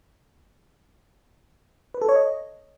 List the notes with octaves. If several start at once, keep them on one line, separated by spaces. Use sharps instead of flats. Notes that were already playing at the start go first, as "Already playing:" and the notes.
B4
A4
C#5
D#5